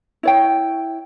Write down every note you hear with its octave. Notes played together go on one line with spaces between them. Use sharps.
E4 C#5 G5